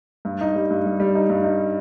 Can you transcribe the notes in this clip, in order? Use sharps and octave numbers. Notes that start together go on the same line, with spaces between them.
G2
D#4
G3
G2
G3
G3
D#4
G2
D#4